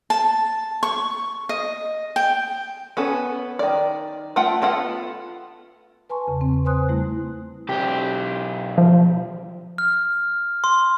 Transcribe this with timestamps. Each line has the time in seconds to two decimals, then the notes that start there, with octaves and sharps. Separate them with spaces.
0.10 A5
0.83 C#6
1.49 D#5
2.16 G5
2.97 B3 C#4 A4
3.59 D#3 D5
4.36 A3 F4 F#5 G5
4.62 B3 F4 A4 F#5
6.10 B4 G#5 A5 C6 C#6
6.27 E2 C#3
6.41 C4
6.65 B4 C5 G#5 C6 D#6 F#6
6.88 G3 A3 E4
7.69 B1 G4
8.78 F3
9.78 F6
10.64 C6